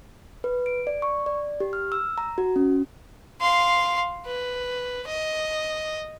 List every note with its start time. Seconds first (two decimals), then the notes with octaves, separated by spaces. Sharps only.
0.44 B4
0.66 D7
0.87 D5
1.02 C#6
1.26 D5
1.60 G4
1.73 F6
1.92 E6
2.18 A#5
2.38 F#4
2.56 C#4
3.41 F5 C6
4.26 B4
5.08 D#5